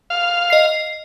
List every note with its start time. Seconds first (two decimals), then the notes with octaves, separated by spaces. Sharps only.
0.10 F5
0.50 D#5 C7